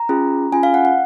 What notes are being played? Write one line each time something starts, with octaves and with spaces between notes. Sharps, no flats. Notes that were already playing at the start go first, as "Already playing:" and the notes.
Already playing: A#5
C#4 F4 G#4
C#4 F4 G#4 G#5
F5
F#5
F#5